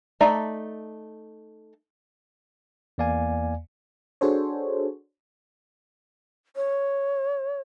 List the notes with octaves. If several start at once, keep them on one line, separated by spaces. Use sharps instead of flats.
A3 D#4 D5 E5 A#5
E2 A#3 D5 F5 G#5
D4 F#4 G#4 A4 C5 C#5
C#5